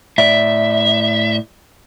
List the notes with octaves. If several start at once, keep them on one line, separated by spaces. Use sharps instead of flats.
A2 D5 E5